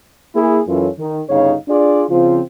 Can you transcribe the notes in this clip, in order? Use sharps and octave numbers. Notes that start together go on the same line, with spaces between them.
A#3 E4 G#4
F#2 E3 C#4 F4 A4
D#3
G1 C#3 D#4 C#5 F5
D4 F4 G#4 D5
C#3 F3 C4 F4